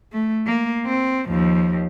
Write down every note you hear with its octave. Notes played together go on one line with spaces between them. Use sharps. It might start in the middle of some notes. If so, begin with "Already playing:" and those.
A3
A#3
C4
D#2 F3